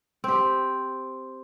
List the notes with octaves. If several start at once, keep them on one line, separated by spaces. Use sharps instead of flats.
C4 G4